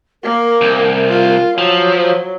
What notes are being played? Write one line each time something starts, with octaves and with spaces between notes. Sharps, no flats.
A#3 A#4
C2
F4
F3 F#3
C5